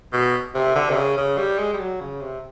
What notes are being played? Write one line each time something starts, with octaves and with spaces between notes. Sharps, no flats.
B2
C3
D3
C3
C#3
C#3
G3
G#3
G3
F#3
C#3
C3